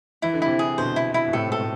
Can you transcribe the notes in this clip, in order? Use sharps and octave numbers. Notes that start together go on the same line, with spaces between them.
E3 E4
D3
C3 E3 E4
G#4
B2 D3 C5
E4
E4
B2
A2 C3 A4
G#2 B2 A4
A2